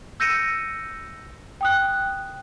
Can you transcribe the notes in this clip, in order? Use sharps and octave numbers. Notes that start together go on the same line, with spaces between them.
E6 G6 A#6 C#7 D#7 E7
G5 D#6 F#6